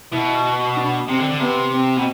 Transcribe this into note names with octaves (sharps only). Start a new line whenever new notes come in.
B2 E4
D4
C3 C4
D3
D3
C3 B3
C4
B2